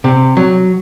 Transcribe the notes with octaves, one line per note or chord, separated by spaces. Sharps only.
C3
F#3